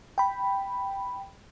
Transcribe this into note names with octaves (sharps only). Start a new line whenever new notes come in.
G5 B5